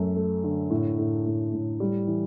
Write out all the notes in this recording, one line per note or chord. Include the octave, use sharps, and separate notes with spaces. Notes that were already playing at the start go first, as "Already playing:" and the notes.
Already playing: F#2 A3
A3
D3
A2
A2
A2
A2
G3
E3